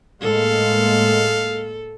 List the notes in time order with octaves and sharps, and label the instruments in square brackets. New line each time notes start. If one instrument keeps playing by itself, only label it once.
[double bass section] A2 G#3 A#3 [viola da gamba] A4 [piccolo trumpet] F5